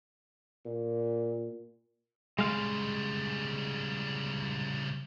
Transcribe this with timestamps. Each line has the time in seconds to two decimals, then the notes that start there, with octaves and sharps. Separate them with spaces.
0.65 A#2
2.39 C#3 G3 G#3 F5